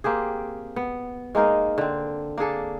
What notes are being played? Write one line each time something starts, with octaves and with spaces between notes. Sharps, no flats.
A#3 C4 G4 G#4
B3
G#3 A#3 D#4 A#4
D3 C4
A#3 D4 G#4 A4